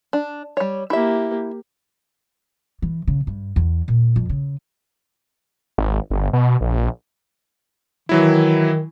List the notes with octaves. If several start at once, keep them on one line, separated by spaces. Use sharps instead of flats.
D4
G3 C#5
A#3 E4 G4 E5
E3
C#3
G2
E2
A#2
F2
C#3
G#1
G1
B2
A#1
D#3 E3 F#3 E4